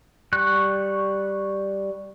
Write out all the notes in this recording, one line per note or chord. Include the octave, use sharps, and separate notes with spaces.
G3 C#6 F#6